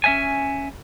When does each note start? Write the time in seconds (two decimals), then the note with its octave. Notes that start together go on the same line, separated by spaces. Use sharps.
0.04 C#4 E5 G#5